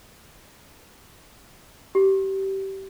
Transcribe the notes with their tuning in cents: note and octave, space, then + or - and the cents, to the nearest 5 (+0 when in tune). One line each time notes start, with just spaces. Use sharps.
G4 -25